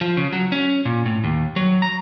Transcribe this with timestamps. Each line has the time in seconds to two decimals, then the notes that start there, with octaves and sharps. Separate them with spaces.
0.01 F3
0.17 C#3
0.33 F#3
0.52 C#4
0.85 A#2
1.06 A2
1.24 D#2
1.56 F#3
1.82 A#5